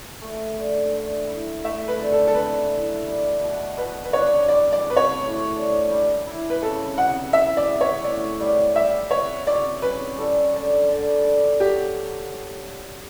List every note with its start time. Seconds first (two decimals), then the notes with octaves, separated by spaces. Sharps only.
0.22 A3
0.57 D3
0.93 D3
1.28 E4
1.64 A3 E5
1.88 B4
1.99 D3
2.12 A4
2.27 A4
2.35 D3 B4
2.70 E4
3.06 G3
3.41 B2
3.77 B2 B4
4.04 B4
4.13 D4 C#5
4.48 G3 D5
4.72 D5
4.85 F#4
4.90 B4
4.96 C#5
5.19 A2
5.55 D4
5.91 G3
6.27 E4
6.50 B4
6.62 C#3 A4
6.98 B3 F#5
7.33 E3 E5
7.57 D5
7.69 B3
7.81 C#5
8.04 A2 D5
8.40 G3 D5
8.75 G3 E5
9.11 F#4 C#5
9.46 B2 D5
9.82 C#4 B4
10.18 G3 A4
10.53 D3
10.89 D3
11.24 D4
11.60 F#3 G4